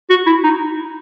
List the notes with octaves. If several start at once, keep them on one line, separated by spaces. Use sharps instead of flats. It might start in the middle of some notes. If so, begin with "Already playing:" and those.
F#4
E4
D#4